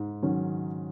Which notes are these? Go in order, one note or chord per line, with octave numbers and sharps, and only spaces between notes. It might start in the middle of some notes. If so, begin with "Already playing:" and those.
Already playing: G#2
D#3 F#3 C#4